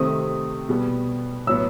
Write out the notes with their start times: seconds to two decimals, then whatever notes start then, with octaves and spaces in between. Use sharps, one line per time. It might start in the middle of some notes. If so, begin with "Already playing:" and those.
Already playing: C3 D#3 A3 C4 D#6
0.69 B2 G3 B3
1.47 A2 F#3 B3 E6